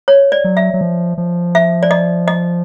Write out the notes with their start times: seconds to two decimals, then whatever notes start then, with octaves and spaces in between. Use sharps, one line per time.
0.08 C#5
0.32 D5
0.44 F#3
0.57 E5
0.74 F#3
0.81 F3
1.18 F3
1.55 E5
1.83 D5
1.91 D#5
2.28 D#5